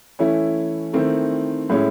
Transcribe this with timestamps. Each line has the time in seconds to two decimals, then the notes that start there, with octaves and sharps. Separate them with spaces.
0.19 E3 A3 C#4 E4
0.93 D#3 A3 C4 E4
1.70 A2 G#3 C#4 E4